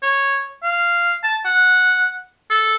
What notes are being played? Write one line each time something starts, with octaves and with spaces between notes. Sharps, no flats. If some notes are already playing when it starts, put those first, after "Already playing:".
C#5
F5
A5
F#5
A4